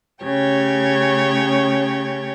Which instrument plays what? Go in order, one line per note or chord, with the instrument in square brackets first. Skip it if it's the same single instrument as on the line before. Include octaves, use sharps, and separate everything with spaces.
[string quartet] C#3 A3 C#4 G4 C#5 G5